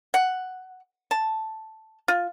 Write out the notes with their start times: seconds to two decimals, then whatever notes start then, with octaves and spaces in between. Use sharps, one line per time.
0.14 F#5
1.11 A5
2.08 F4